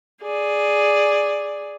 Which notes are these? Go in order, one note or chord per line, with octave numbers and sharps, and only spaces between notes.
G#4 D5